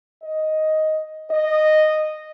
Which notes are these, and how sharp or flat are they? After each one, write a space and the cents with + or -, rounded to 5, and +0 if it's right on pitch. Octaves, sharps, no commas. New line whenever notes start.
D#5 +5
D#5 -10